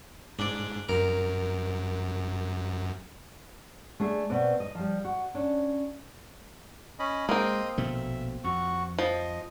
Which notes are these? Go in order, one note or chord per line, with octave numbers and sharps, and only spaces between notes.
G#2 D4 D5
F#2 A#4
A3 D4 G#4
B2 C4 B4 D5
D#5
F3 G3
F#4
C#4 D4
C#4 D#5 B5
G#3 A#3 C4 D#5 C6 D#6
A#1 B2 A3 E5
F2 F#4 C#6
F3 D#5